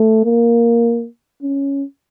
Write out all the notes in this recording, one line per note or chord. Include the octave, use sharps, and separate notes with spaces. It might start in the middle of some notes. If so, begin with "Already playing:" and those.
Already playing: A3
A#3
C#4